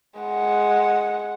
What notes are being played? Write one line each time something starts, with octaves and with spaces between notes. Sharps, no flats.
G#3 F#5